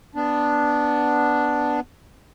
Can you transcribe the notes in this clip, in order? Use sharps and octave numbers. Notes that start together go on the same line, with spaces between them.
B3 D4